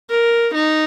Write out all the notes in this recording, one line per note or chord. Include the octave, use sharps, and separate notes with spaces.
A#4
D#4